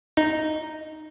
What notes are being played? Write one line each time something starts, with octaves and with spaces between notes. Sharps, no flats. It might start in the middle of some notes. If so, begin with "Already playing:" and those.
D#4